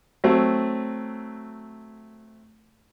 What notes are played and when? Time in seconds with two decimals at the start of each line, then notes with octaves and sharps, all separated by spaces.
0.24 F#3 A3 C4